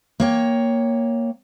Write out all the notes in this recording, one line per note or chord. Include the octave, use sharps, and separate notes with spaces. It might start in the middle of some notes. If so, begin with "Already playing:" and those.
A#3 C#5 G5